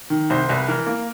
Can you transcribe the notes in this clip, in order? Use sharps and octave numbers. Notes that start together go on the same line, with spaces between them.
D#3
C2 C5
C2 B4
E3 A#4
A#3